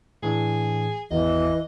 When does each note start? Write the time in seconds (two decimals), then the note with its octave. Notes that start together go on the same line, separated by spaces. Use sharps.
0.23 A2 E3 D4 G#4
1.11 G#1 E2 E3 D#5